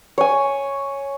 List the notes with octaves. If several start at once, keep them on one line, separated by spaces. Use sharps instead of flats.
C#5 G#5